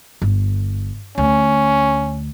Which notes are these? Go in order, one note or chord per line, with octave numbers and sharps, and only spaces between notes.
G1
D2 C#4